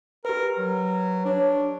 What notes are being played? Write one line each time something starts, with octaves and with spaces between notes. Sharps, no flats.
G4 A#4 B4
F#3
D4 C#5